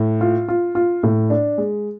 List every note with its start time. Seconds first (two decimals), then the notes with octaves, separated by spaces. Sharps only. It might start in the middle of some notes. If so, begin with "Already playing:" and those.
Already playing: A2
0.21 F4
0.48 F4
0.75 F4
1.03 A2
1.30 D4
1.58 G#3